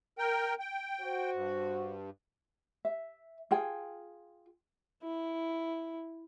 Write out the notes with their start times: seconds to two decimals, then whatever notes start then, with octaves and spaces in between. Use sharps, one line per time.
0.18 A#4 G5
0.59 G5
1.01 F#4 C5
1.34 G2
2.85 E5
3.51 F4 G#4 G5
5.03 E4